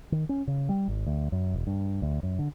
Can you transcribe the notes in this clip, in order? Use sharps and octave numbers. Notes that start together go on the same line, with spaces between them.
D#3
C#4
C#3
G3
G#1
D2
F#2
E1
G2
D2
F#2
D3